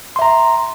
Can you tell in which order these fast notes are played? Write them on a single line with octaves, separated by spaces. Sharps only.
C6 E5 A#5